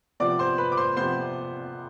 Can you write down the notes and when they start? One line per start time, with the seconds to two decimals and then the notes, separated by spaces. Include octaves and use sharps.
0.20 C3 F3 B3 D5 D6
0.39 C5 C6
0.58 B4 B5
0.72 D6
0.77 C5 C6
0.97 C3 F3 B3 C5 C6